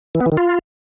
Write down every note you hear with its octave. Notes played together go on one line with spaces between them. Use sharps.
E3
B3
E3
D#3
F4